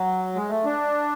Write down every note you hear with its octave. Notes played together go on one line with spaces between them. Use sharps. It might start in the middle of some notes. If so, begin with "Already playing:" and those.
Already playing: F#3
G#3
A3
D4